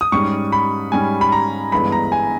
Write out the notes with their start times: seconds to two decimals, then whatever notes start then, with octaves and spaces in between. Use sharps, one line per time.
0.01 D#6
0.12 G#2 G3 C#4 C#6
0.52 B5
0.92 G#2 G3 C#4 G#5
1.21 B5
1.32 A#5
1.72 G1 G2 E3 G#3 B3 B5
1.92 A#5
2.12 G#5